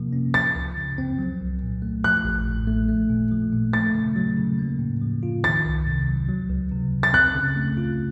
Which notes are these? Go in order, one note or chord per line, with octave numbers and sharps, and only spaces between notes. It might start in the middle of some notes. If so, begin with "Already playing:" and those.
Already playing: C3 F3 A#3
C#4
F3 A6
C#2
C#3
C4
F#3
C2
A#2
A3
F3 F#6
A1
A2
A3
A3
A#2
F3
A#2
A3 A6
C#3
F#3
C#3
A#3
A2
F3
F4
D#3 A6
C2
C3
F#3
F#3
C#2
C3
C#2
A6
C4 F#6
C#3
A3
F4